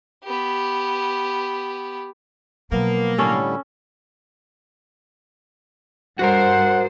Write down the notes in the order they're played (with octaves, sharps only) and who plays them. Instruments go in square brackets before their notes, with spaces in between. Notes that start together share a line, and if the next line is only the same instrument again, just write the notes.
[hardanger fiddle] B3 G4
[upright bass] B2 F#3 [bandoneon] F3 B3 [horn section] A#3
[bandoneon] A2 D3 G3 [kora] C#4 A4
[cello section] G2 C5 [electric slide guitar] F#4 A4 A#4 [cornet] F#5